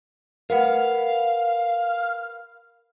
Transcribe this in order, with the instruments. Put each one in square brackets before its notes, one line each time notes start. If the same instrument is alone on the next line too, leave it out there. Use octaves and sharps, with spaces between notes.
[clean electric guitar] A#4 B4 F#5 [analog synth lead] F5